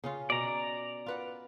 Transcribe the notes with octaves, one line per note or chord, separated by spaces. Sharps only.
C#3 C#4 F4
B2 D5 A#5
F4 B4 F#5